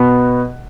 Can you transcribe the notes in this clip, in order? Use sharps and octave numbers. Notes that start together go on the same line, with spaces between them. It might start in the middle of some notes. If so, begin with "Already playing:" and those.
Already playing: B2 B3